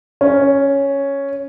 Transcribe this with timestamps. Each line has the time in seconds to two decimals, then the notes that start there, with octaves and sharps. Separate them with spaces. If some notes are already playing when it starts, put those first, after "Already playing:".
0.21 C#4